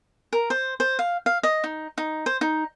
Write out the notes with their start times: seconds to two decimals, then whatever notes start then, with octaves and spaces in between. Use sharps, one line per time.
0.33 A#4
0.50 C5
0.80 C5
0.99 F5
1.26 F5
1.43 D#5
1.64 D#4
1.98 D#4
2.26 C5
2.41 D#4